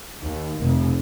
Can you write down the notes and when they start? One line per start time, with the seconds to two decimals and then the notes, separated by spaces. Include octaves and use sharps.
0.23 D#2
0.60 F1